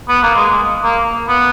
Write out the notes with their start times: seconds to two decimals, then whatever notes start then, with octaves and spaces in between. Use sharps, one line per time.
0.08 B3
0.23 A#3
0.35 G#3
0.83 A#3
1.29 B3